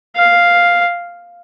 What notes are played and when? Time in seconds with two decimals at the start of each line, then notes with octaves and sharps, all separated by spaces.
0.16 F5